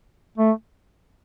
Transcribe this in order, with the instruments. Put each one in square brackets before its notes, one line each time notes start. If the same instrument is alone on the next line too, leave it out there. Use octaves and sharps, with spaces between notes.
[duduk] A3